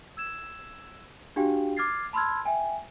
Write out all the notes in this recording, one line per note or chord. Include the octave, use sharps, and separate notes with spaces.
E6 G#6 E7
D4 F#4 G4 F5 G5
D6 F6 G#6 A6 C7
A5 B5 C6 E6 F6 G#6
E5 G5 G#5